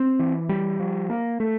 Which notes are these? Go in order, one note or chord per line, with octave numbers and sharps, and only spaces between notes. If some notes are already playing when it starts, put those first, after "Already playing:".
Already playing: C4
E3
G3
F3
A#3
A3